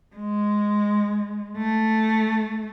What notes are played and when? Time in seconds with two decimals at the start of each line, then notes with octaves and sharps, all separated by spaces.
0.16 G#3
1.57 A3